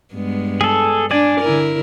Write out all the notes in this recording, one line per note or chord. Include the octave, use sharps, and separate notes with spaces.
G2 G#3 B3
G#4 A4
D4 D5 G#5
D3 E4 A#4